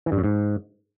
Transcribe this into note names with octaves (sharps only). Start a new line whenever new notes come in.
E3
G2
F#2
G#2